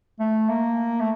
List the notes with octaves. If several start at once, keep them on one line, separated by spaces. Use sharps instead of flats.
A3
A#3
A3